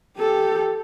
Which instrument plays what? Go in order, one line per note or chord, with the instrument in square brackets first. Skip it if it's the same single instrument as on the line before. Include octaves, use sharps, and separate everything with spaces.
[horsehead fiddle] G4 A4